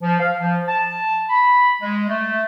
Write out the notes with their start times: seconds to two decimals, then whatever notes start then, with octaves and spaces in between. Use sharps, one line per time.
0.02 F3
0.19 F5
0.39 F3
0.67 A5
1.29 B5
1.82 G#3
2.09 A3